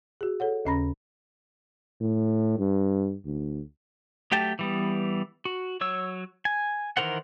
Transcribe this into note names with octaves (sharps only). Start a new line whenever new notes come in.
F#4 G#4
A4 C#5 F#5
D#2 C#3 C#4 A#5 B5 A#6
A2
G2
D2
F#3 A3 G4 G5 A5
E3 G3 B3
F#4
F#3 C#5 E6
G#5
D#3 E3 A#4 C5 F#5